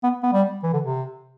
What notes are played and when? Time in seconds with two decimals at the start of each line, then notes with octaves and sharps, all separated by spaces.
0.03 B3
0.23 B3
0.33 G3
0.63 E3
0.73 D3
0.83 C3